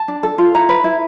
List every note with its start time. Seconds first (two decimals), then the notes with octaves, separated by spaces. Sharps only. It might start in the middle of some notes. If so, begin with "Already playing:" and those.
Already playing: A5
0.08 D4
0.23 A4
0.38 F4
0.54 E4 A#5
0.69 B4
0.84 E4